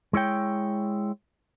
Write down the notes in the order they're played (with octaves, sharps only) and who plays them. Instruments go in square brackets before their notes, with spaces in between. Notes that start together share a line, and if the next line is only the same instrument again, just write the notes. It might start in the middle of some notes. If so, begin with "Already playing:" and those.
[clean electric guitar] G#3 E4 C#5 G5